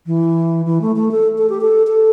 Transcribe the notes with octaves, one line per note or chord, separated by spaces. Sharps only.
E3
E3
A3
A3
A4
A4
G4
A4
A4